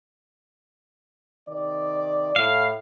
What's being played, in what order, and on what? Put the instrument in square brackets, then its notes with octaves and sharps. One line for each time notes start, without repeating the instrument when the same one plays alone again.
[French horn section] C3 D#3 D5
[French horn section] A2 [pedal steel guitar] F5